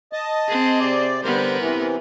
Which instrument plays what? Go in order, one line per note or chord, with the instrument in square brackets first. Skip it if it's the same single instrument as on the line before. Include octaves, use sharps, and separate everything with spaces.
[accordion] D#5 A5
[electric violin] C4 G#4
[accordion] C3 D5
[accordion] D3 G3 C5 [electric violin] B3 A#4
[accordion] C3 E3